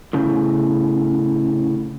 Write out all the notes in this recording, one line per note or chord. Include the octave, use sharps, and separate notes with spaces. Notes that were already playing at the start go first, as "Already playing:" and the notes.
A2 C#3